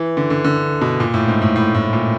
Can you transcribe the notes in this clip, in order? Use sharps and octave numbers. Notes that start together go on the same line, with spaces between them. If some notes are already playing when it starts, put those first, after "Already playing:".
Already playing: E3
D3
D3
D3
B2
A#2
A2
G#2
A2
A2
A2
A#2